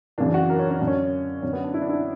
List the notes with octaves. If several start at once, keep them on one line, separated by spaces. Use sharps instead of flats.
F#2 C#3 E3 D4
F#4
A#4
C#4
C#4
F#2 D3 D4
C#4
F#2 D3 C#4
B3
D4
E4
D4
E4